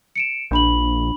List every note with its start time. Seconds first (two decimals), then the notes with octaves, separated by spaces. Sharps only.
0.16 C#7 D7 E7
0.51 A#1 D4 B5 F#7